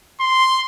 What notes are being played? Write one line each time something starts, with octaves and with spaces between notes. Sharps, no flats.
C6